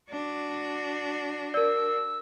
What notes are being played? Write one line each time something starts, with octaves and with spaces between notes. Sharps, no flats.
D4 F#4
A#4 D5 E6